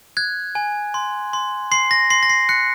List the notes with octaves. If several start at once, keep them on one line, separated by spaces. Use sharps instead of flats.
F#6 G#6
G#5
C6
C6
C6 C7
A#6
C6 C7
A#6
C7
F#6 C#7